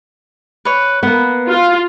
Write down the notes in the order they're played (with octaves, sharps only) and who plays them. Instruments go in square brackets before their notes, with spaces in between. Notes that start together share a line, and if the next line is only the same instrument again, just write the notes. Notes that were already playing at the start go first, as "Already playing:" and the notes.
[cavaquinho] B4 C#5
[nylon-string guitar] A#3 B3 [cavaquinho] F#5
[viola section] F4